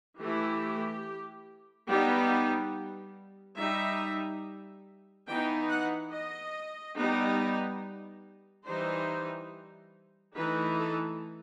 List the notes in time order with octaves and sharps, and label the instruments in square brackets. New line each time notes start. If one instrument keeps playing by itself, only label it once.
[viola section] E3 A3 E4 G4
G3 B3 D#4
G3 D#4 E5
E3 B3 D#4 G5
F#5
D#5
G3 B3 D#4
E3 G3 D#4 C5
E3 A3 D#4 B4
A4